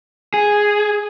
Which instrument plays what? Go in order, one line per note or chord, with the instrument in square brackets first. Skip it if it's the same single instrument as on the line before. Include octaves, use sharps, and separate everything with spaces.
[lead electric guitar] G#4